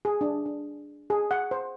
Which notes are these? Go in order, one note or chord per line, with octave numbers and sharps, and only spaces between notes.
G#4
D4
D4
G#4
F#5
C5